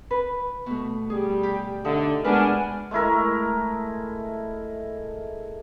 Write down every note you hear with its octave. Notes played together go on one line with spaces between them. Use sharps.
B4
B2 A3
G3 G#4
G4
D3 D#4 E5
B2 G#3 D4 A#4 B4 F#5 G#5 F6
G#3 A3 E4 A#4